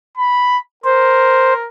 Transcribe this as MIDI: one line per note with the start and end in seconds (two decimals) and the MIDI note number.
0.18 0.58 83
0.84 1.68 70
0.84 1.53 72